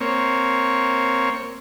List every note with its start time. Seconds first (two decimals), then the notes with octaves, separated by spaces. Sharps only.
0.01 A#3 C4 C#5